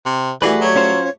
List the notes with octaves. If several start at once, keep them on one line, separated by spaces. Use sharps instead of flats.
C3
E3 G3 A3 F#4 G#4 B4
F#3 C#5
C#4 F4 C5